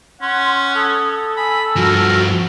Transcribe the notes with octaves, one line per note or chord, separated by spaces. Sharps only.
C#4 F#5 C6
A4 D#6
G#5 B5
G2 F3 F#4 A#4